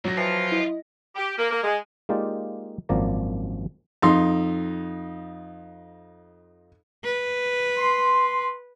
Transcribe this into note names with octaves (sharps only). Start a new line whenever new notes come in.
D2 F#3 A#6
E3 F3 F4 A5
E4 D#5
G4
A#3
A#3
G#3
G#3 A#3 D#4 F4 G4 D5
G#1 F#2 F3 A#3 D5 A#5
F2 D#4 C6
B4
C6